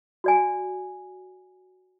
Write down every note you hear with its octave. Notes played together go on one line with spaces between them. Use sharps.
F#4 D5 G#5